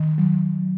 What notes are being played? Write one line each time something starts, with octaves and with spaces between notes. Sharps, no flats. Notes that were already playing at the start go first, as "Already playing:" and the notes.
Already playing: D#3
F#3